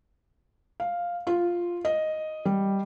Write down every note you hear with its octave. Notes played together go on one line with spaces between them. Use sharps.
F5
F4
D#5
G3